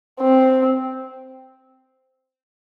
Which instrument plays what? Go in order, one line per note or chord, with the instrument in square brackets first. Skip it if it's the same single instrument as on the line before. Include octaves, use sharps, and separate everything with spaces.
[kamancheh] C4